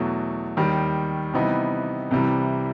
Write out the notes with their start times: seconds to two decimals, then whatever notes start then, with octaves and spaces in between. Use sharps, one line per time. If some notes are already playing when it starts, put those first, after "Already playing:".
Already playing: E2 B2 F#3 A3
0.57 D#2 D#3 G3
1.34 C3 E3 G3 B3 D#4
2.11 C2 C3 E3 G3